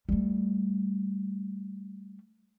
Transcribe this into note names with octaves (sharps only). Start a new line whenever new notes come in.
G3 A3